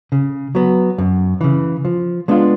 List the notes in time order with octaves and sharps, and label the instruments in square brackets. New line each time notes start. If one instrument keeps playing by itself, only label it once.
[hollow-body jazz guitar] C#3
F#3 B3
F#2
C#3 E3
F3
G#3 B3 D4 F4